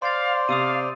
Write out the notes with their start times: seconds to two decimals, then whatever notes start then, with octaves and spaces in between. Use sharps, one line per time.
0.02 C5 D5 F5 C6 A6
0.49 C3 F5 D#6 E6 D#7